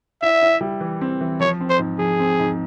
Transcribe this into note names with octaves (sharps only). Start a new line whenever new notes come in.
E4 E5
E4
G3
E3
C4
E3
F3 C#5
C4
C5
G#2
F3 G#4
C4
G#2